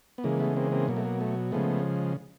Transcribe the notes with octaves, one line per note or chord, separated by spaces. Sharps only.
B3
C#3 E3 G#3 A#3
A3 B3
A#3 C4
A#3 C4
B2 F#3 A#3
A3
A#3
A3
C#3 F3 G#3 A3 B3